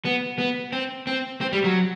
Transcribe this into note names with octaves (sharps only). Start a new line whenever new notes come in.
B3
B3
C4
C4
C4
G3
F#3